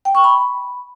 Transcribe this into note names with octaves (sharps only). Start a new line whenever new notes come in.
G5
C#6
B5